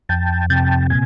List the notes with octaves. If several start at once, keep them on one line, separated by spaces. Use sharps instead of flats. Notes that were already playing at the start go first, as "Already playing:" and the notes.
F2 G5 A5
C3 G5 A5
A#2 G#5